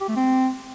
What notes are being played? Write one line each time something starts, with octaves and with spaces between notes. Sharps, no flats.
G4
A3
C4